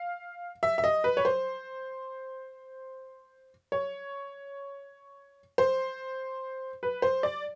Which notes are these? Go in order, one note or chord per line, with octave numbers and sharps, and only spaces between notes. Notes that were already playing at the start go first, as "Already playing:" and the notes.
Already playing: F5
E5
E5
D#5
B4
C#5
C5
C#5
C5
B4
C5
D5